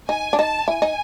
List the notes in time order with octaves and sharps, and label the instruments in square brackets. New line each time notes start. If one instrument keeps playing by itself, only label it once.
[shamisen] D#4 [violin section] G#5
[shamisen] D4
[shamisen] D#4 [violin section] A5
[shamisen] E4 [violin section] G#5
[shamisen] D#4